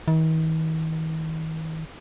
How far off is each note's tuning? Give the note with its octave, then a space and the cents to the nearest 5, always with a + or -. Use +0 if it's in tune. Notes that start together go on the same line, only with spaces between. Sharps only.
D#3 +45